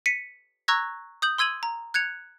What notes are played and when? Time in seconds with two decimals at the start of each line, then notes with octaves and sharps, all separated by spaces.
0.06 B6 C#7 D#7
0.68 A#5 C#6 E6 F#6 G#6 A#6
1.22 D#6 G6 F#7
1.38 C6 E6 G#6 D#7 F#7
1.63 A#5
1.94 F#6 G#6 C#7 F7